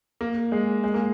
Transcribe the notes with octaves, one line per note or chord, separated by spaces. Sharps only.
A#3
G#3
G#3
A#3